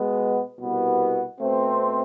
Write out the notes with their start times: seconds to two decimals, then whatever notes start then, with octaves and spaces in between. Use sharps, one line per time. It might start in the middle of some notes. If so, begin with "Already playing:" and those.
Already playing: B2 G#3 B3
0.58 C2 B2 B3
1.40 B2 A3 C4